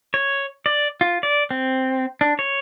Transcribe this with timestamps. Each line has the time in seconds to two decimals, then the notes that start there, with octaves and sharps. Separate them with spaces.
0.14 C#5
0.66 D5
1.01 F4
1.23 D5
1.51 C4
2.21 D4
2.39 C#5